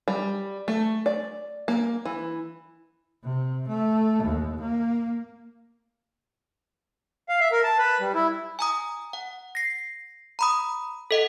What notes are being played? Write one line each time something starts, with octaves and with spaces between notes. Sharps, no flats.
G3
A3
D5
A#3
E3
C3
A3
D#2
A#3
F5
E5
A#4
A5
B4
G3
E4
G#5 A#5 D#6
F#5
A#6 C7
A#5 B5 D#6
A4 D#5 F#5